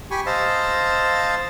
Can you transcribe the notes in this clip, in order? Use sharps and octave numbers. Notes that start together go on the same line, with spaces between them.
G4 G#5 B5 C#6
C5 D#5 F5 A5 E6